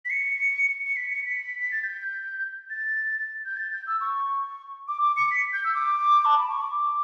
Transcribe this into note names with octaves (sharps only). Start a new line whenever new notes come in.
B6
C#7
C#7
B6
C#7
B6
B6
A6
G6
A6
G6
A6
G6
E6
C#6
D6
D6
C#7
B6
G6
E6
D6
A5
B5
C#6
D6